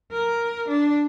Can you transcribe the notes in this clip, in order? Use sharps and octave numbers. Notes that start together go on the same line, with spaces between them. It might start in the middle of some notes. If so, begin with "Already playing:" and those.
A#4
D4